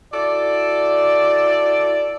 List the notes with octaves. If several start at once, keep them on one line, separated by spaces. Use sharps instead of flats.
E4 F#4 A4 D5